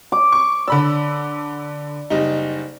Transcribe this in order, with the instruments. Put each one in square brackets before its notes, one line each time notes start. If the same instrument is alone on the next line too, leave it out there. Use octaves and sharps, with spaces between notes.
[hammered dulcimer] D6
[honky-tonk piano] C#6
[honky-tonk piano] D3 B5 E6 [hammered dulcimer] D5
[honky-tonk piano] F#1 G3 D#4